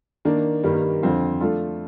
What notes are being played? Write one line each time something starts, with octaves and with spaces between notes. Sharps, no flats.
D#3 A#3 D4
G2 D#3 G3 A#3
F2 D3 F3 C4 F4
F3 A3 D4 F4 A4